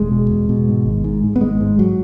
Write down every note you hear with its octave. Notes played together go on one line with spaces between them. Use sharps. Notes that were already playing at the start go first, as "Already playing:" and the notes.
Already playing: E1 G#3
B2
E2
B2
G#2
G#1
G#2
G#2
B3
G#1 G#3
G#2
G#2 F#3